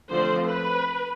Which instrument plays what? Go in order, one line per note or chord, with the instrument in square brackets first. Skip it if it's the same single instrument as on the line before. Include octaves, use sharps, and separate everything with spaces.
[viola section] D3 F3 A3 C4 C5
B4